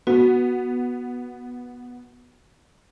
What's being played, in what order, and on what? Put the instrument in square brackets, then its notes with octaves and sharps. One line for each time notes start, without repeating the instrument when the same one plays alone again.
[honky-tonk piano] B3 [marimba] F#4